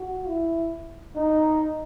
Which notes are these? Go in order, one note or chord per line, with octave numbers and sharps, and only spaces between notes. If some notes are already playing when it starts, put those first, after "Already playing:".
Already playing: F#4
E4
D#4